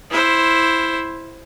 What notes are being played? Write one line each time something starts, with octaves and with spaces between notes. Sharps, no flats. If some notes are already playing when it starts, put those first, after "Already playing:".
E4 C5